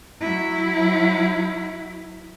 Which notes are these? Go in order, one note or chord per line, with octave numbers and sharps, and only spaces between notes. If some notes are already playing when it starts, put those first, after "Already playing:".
F#3 E4